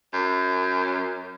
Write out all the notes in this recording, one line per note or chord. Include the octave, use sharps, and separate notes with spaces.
F#2